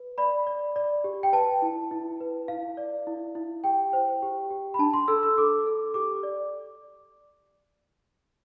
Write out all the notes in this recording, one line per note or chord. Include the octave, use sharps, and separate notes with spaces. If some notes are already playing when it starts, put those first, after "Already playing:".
Already playing: B4
D5 B5
D5
D5
G4
G5
B4 A5
E4
E4
B4
E4 F5
D5
E4
E4
G4 G5
C5
G4
G4
B5
D4 A5
C6
A4 E6
E6
A4 D6
A4
G4 D6
D5